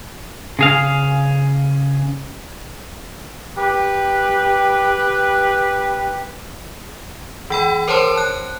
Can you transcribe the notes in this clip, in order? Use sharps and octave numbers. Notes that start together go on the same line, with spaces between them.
C#3 G#4 F5
G4 B4
E3 G5 B5
A#4 C5 C#5 A5 C6
A5 F#6